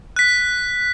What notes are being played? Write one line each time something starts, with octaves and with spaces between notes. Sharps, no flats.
F#6 B6